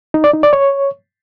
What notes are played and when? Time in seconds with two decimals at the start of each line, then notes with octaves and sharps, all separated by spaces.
0.14 D#4
0.24 D5
0.34 D#4
0.43 D5
0.53 C#5